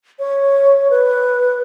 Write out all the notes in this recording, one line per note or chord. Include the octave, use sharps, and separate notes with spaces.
C#5
B4